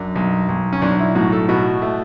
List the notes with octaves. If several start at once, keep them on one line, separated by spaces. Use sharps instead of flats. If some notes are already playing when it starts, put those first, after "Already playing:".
Already playing: F#2 D4
B1
B1
C#4
B1 D4
E4
A2 F#4
A4
B2 F#4
A3